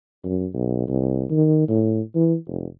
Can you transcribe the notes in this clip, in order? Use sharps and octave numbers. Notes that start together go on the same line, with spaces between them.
F#2
B1
C2
D#3
A2
E3
F1